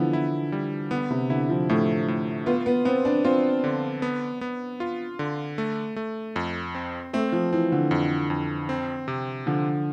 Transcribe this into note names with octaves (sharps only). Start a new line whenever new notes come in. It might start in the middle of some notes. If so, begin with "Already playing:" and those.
Already playing: D3 E3 F3 B3
E4
G3
D3 B3
C3
D3 E4
F3
A2 A3
A2
B3 F4
B3
B3 C4
D4
C4 F4
D3
B3
B3
F4
D3
A3
A3
F2
C4
A3 C4
F3
E3 C4
D3
F2
F2
C4
C3
D3 F3